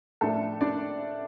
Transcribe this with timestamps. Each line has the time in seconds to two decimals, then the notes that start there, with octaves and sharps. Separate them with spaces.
0.21 A2 F3 A3 D4 A4
0.61 D4 D5